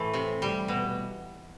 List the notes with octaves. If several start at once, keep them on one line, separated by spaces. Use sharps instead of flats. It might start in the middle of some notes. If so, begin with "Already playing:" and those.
Already playing: A2 E3 A3
C3
G3
B2